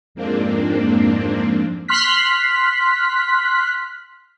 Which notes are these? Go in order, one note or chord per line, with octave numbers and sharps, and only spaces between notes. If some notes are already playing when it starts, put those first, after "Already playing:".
F2 G#2 A#3 C4 D4
C6 F6 F#6 B6